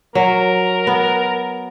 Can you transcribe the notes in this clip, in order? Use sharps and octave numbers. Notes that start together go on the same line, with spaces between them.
F#3 A#4
B3